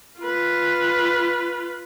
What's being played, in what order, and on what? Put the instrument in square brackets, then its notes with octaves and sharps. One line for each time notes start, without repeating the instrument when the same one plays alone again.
[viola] F4 B4